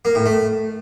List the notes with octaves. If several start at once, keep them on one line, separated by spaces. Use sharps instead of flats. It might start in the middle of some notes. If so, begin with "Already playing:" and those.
A#3
A2
A3